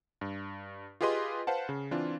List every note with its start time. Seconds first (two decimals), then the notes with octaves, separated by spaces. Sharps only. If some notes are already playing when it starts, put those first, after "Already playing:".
0.21 G2
1.01 F4 G4 G#4 B4 D#5 C6
1.47 B4 C5 F5 F#5 A5
1.69 C#3
1.91 E3 C4 D4 F4